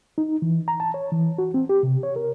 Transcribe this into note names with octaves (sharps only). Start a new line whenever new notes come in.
D#4
E3
A#5
A5
C#5
E3
F#4
C4
G4
C3
C#5
A#4